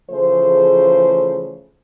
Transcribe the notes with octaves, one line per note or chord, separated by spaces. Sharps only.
C#3 E3 F3 A3 G#4 C5